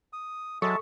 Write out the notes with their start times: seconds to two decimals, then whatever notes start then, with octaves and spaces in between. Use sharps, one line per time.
0.13 D#6
0.62 F#3 G#3 A4 E5 A5 C#6